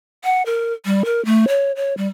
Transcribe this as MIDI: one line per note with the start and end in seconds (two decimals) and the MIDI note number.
0.24 0.43 78
0.46 0.73 70
0.86 1.03 55
1.05 1.23 70
1.25 1.45 57
1.48 1.72 73
1.76 1.95 73
1.97 2.07 55